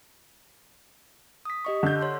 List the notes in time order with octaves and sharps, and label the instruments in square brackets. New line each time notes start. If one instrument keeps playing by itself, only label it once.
[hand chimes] D#6 B6
G4 D#5 C#6
[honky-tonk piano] D3 G6
[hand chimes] C#5 C6